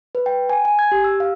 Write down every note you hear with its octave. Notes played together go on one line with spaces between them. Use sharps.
B4
G5
G#5
G#5
G#6
G4
E6
F5